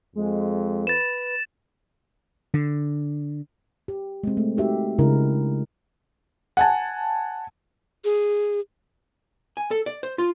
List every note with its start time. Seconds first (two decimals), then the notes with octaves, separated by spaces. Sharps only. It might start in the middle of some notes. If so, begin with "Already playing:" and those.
0.16 F2 G#3
0.87 B4 A6 E7
2.54 D3
3.88 G4
4.23 G#3 C4
4.37 A3
4.57 D#4 F#4 G4 A#4 E5
4.99 C#3 G#3 D4 E4 A#4
6.57 F#5 G#5 A5
8.04 G#4
9.57 G#5
9.71 A4
9.86 D5
10.03 C5
10.18 F4